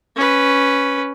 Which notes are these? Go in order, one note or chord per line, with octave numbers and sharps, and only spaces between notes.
C#4 B4